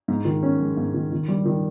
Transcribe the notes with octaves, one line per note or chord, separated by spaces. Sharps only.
G#2
D#3
C#4
G#3
G#2
D#3
D#3
G3
D#3